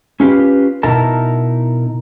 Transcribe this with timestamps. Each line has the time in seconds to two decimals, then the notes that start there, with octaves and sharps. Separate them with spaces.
0.20 C#4 F4 G4 B4
0.83 B2 D#4 E4 A#4 A5